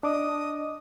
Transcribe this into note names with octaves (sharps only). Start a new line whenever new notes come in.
D4 D#5 D6 D#6